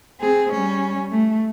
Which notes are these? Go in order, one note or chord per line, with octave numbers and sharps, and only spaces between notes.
C4 G#4
G3 C#4
A3